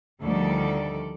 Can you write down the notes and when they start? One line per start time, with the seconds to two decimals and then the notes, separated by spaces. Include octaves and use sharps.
0.21 D2 D#3 F3 G3 A4 D5